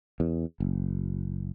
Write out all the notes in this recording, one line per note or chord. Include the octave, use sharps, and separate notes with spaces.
E2
F#1